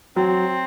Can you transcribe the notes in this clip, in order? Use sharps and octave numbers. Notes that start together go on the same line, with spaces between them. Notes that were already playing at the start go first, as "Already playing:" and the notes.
F#3 C4